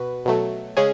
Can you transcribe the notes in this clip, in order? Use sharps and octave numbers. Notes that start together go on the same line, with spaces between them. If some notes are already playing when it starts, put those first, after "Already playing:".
Already playing: B2 F#4 B4
B2 F#3 A3
C#3 G#3 C#4 G#4